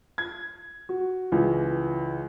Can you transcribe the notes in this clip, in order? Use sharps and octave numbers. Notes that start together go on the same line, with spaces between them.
G#6
F#4
C#2 E3